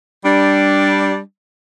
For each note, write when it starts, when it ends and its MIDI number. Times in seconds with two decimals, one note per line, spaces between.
0.24 1.17 55
0.24 1.17 62